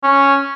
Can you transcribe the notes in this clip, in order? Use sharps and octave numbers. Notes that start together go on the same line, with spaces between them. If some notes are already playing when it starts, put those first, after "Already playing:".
C#4